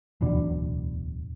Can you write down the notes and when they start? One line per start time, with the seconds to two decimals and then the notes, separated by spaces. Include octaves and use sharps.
0.21 D1 E2 B2 D4